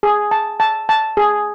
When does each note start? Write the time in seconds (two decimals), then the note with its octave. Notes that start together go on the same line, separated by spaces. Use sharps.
0.03 G#4
0.31 A5
0.60 A5
0.89 A5
1.17 G#4